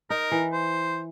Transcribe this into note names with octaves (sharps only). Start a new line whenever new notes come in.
D#4 A#4
E3
C5